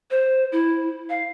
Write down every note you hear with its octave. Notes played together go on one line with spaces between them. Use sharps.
C5
E4
F5